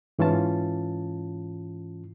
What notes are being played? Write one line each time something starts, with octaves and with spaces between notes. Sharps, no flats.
G#2 E3 C#4 F4 A5